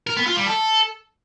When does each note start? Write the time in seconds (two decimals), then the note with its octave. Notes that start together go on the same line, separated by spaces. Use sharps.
0.07 A#4
0.17 B3
0.27 F4
0.37 G3
0.47 A4